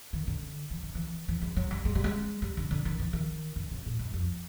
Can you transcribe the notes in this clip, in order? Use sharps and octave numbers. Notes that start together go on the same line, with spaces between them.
D#3
D3
E3
D#3
E3
E3
G#3
F#3
G3
G#3
G3
G#3
G3
D3
D3
D#3
E3
D#3
D3
C#3
A2
F#2
F2